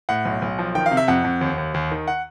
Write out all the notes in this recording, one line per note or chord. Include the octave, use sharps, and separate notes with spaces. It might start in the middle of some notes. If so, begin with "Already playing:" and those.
A2 F#5
B1
B1
F3
D#3 G5
F5
C3
E5
F2 F#5
F2
D#2
D#2
D#2
D#3
F#5